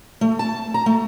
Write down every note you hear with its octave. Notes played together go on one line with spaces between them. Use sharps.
A3
A5
A#5
A3